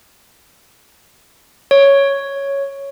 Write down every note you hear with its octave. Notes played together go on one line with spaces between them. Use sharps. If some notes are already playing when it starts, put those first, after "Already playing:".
C#5